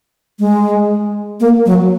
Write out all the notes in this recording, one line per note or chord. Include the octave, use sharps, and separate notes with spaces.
G#3
A#3
F#3